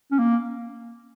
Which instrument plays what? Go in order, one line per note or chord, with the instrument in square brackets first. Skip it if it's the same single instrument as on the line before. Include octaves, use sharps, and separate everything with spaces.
[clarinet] C#4
A#3